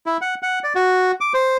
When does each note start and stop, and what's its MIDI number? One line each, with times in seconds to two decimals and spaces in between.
0.06 0.17 64
0.21 0.35 78
0.43 0.59 78
0.64 0.73 74
0.75 1.12 66
1.21 1.33 86
1.34 1.57 72